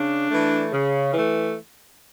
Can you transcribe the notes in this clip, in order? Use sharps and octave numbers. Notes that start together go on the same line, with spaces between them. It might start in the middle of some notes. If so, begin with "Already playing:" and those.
Already playing: C#3 D4
E3 A3
C#3
E3 A3